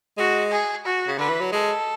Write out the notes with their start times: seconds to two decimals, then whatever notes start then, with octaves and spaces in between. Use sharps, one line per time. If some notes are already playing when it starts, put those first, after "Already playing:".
0.18 G#3 F#4
0.52 G#4
0.85 F#4
1.07 C#3
1.18 D3 B4
1.29 E3
1.41 F#3
1.52 G#3 A4